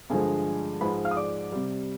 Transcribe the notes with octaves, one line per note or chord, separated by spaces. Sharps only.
G2 D3 F3 G#3 G#4 G#5
G#2 F3 G#3 B4 B5
F5 F6
D#6
D5 D6
C3 G3